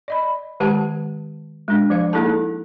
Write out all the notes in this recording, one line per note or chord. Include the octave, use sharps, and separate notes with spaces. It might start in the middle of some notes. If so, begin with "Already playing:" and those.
D5 D#5 B5
D#3 G#3 G4 C5 F#5 A5
G#3 D4
F3 C5 F5
A#3 D#4 E4 G#4 A4 A5